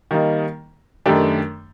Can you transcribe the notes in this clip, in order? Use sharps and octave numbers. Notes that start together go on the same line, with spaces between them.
D#3 G3 A#3 D#4
F#2 D#3 A3 D4 G4